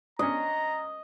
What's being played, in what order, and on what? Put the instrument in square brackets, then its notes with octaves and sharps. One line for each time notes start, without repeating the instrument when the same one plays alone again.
[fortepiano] C#4 D4 [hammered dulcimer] D#5 [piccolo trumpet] A#5